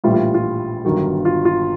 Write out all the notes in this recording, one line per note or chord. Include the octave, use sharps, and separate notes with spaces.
A#1 A2 E3 G3 F4
F4
F4
G1 G2 D#3 F#3
F4
F4